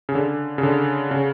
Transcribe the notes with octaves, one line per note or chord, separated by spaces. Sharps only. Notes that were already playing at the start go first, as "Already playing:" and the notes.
C#3
D3
C#3
D3
C#3